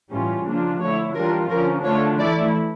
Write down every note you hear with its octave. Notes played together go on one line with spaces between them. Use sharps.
A2 E3 G3 C#4 F4
C#3 F3 A#3 D4 F4
D3 A3 E4 C#5
E3 G3 D4 F4 A#4
D3 F3 C#4 A#4
D3 A3 D4 F4 C#5
E3 A3 E4 D5